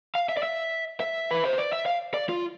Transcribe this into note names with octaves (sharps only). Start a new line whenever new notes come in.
F5
E5
D5
E5
E5
B4
C5
D5
E5
F5
D5
F4